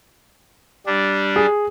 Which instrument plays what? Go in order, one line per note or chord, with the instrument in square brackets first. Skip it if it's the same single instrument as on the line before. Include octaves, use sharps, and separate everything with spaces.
[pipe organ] G3 D4
[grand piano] G#4